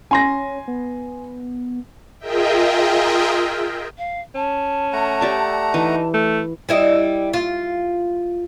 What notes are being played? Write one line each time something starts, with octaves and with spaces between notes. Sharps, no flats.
C#4 G#5 C6 A#6
B3
F4 G#4 A#4 D#5 E5 G5
F5
C#4 A5
A3 F#5 A#5
G4 D5 E5
E3 D#4
A3
G3 E4 D#5
F4